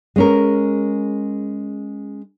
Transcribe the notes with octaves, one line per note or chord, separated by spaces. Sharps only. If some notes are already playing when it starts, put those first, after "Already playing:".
G#3 C#4 A#4